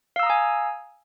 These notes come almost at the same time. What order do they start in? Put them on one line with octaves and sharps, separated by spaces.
F5 E6 A#5 D#6 G#5